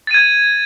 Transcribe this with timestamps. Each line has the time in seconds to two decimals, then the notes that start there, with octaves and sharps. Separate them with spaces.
0.07 A6
0.11 D#7
0.14 G#6